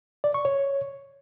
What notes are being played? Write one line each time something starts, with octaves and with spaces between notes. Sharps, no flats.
D5
C#6
C#5